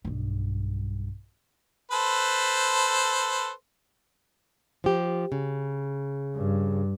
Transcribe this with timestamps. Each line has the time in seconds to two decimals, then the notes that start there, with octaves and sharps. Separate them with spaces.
0.05 B1 G2
1.91 A4 B4 C5
4.84 F3 G4
5.32 C#3
6.36 G2